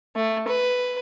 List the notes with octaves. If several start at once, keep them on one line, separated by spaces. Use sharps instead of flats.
A3
B4